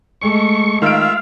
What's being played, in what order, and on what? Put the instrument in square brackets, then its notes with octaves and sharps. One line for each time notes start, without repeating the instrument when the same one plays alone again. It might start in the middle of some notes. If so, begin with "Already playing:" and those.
[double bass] G#3 A3 [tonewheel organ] C#6
[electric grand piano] D#3 D7 [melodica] F4 E5 [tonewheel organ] F5